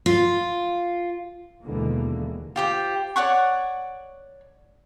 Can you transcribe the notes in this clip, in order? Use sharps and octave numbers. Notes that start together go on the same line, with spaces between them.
F4
D#2 B2 D3 E3 G#3 A#3
F4 G4 C5
C#5 D5 F#5 C#6